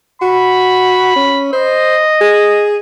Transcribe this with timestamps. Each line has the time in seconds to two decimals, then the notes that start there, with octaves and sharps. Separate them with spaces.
0.22 F#4 B5
1.16 C#4
1.53 C5 D#5
2.21 G#4